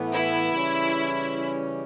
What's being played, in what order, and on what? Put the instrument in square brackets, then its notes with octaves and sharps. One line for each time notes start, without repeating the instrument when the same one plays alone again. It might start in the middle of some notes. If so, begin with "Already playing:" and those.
Already playing: [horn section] A2 E3 B3
[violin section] E4
[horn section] C#3 E3 G3 C#4